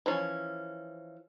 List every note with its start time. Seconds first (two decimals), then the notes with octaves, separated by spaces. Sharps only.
0.06 E3 F3 C#4